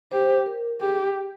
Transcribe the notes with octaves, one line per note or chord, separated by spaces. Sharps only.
G4 C5
A#4
G4 G#4
G4